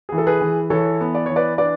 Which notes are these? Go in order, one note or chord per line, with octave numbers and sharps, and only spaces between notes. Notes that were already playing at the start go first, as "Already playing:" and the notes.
E3 G#4
A4
G#4 B4
E3
E3 A4 C#5
B3
D5
E3 C#5
B4 D5
D4 B4 D5